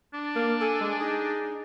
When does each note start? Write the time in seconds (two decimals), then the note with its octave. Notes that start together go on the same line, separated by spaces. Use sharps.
0.14 D4
0.36 A#3
0.61 A4 G#5
0.81 G#3
1.00 D#4 G#4